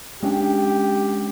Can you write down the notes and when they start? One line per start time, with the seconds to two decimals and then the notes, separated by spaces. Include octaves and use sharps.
0.23 G#3 C#4 D4 G4